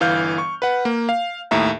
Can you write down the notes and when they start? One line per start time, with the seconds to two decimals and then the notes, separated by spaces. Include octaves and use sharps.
0.01 G1 E3 F5 F6 G6
0.38 C#6
0.62 B4 F#5
0.85 A#3
1.09 F5
1.51 D#2 A2 E5 A#5